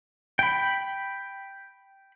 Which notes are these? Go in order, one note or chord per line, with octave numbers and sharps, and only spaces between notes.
G5 B5